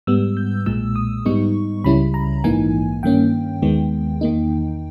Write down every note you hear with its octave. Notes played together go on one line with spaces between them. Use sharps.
G#2 G3 B3 E6
G6
B1 A#2 G#3 E6
D#6
G#2 G3 B3 D#4 C#6
C#2 C#3 G3 C#4 E4 B5
A#5
A#1 G#2 E3 A#3 D#4 G#5
G2 D#3 A#3 C#4 G5
D#2 D#3 G#3 B3
E2 D#3 A#3 D#4